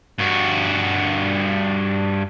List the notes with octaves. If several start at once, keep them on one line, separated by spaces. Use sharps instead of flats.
G2 F#4